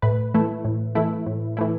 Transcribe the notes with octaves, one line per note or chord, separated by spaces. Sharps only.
A2 B4
E3 A3 E4
A2
E3 A3 E4
A2
E3 A3 E4